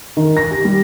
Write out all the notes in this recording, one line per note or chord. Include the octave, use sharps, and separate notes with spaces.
D#3
A#6
G4
G3